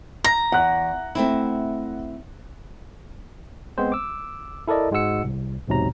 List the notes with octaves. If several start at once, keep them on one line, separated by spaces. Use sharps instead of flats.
A#5 A#6
E2 F#5 F#6
A3 C4 E4
G#3 B3 C4 C5
D6 E6
E4 A4 A#4 D5 D#5
G#2 G#3 F#4 F#5 E6 C#7
C2
B1 E2 G#2 C3 F#3 A#5